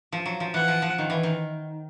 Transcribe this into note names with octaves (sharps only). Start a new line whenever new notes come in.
F3
F#3
F3
E3 F#5
F3
F3
D#3
E3
D#3